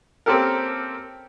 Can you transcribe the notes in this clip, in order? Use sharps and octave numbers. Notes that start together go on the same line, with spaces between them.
A#3 C4 C#4 G4 A4 A#4